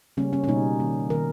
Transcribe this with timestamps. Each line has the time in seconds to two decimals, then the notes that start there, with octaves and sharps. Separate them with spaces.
0.17 C#3 G3 A#3 C#4
0.33 C#4
0.44 C#4
0.48 B2 G3 A#3 D#4
0.80 D#3 A#3
1.10 D#3 A#4
1.14 A#3